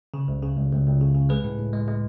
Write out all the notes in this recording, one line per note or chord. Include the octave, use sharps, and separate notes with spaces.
C#3
C#2
C#3
C#2
C#2
C#2
C#3
C#3
G#3 G#4 B4
A2
A2
G#3
G#3